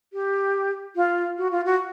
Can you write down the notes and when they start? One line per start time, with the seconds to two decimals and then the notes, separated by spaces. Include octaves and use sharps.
0.13 G4
0.96 F4
1.38 F#4
1.51 F4
1.65 F#4